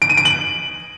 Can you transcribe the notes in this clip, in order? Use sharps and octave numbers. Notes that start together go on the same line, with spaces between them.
D7
D#7
D7
F#7